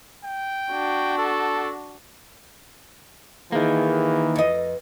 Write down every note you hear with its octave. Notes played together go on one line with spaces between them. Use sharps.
G5
D4 F#4
A4
D#3 E3 A#3 G#4
F2 B4 D#5